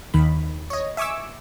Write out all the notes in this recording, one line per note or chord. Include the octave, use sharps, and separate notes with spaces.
D#2 D#3 B5
C#5 D#5
E5 G#5 C#6 D6 E6